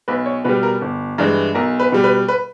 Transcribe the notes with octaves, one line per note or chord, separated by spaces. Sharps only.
B1 B4
C#5
B2 G3 B4
A#4
G1
G2 E3 G#3
B1 A#4
B4
B2 G3
B4
B4